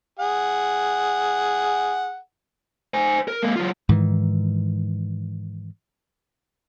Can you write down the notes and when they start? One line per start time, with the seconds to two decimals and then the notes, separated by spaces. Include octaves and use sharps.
0.19 G#4 F#5
2.94 C5 G#5
3.28 A#4
3.43 G#3 A#3
3.56 F#3 F4
3.89 G#2 D#3 E3